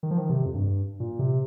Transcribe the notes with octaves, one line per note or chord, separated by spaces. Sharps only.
D#3
F3
D#3
C3
F2
G2
A#2
C3